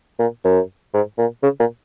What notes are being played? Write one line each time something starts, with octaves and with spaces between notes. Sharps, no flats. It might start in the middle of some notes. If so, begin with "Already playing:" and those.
A#2
F#2
G#2
A#2
C#3
A#2